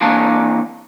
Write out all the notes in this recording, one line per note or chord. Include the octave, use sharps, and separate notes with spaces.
C3 E3 A#3 D4 F5 A5